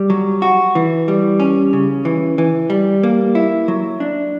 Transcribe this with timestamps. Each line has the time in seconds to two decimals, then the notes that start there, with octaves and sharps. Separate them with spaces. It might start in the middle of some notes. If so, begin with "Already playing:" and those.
Already playing: G3
0.10 F#3
0.42 F#4
0.75 E3
1.08 G3
1.40 C#4
1.73 C#3
2.05 E3
2.38 E3
2.70 G3
3.03 A#3
3.35 E4
3.68 F#3
4.00 D4